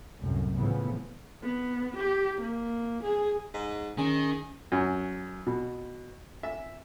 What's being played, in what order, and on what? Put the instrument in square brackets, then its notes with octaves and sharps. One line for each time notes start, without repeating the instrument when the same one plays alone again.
[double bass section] C2 F#2 A2
A2 C#3 E3 F3 B3
[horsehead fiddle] B3
G4
A#3
G#4
[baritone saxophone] G#2
[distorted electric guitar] D#3 [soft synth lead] C#4 [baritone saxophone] G#4
[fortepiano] F#2
B2
E5